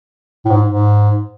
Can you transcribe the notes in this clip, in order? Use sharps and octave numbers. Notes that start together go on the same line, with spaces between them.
A2
G#2
G#2